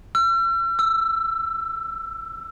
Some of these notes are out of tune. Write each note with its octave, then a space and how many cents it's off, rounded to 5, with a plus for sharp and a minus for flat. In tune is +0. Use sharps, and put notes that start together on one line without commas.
E6 +45
E6 +10